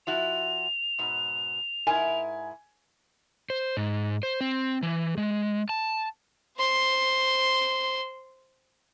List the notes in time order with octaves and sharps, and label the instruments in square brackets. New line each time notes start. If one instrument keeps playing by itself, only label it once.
[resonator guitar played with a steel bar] F3 E4 F#4 [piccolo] F7
[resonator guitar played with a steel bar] G#2 B2
[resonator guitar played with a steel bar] G#2 E4 A#4 [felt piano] G#5
[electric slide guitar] C5
G#2
C5
C4
E3
G#3
A5
[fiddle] C5 C6